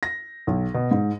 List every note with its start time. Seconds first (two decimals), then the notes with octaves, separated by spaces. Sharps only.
0.03 A#6
0.47 B1
0.74 B2
0.91 G#2